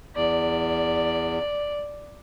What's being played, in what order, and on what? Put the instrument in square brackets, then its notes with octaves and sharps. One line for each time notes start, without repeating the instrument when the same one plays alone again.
[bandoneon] E2 [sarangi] D5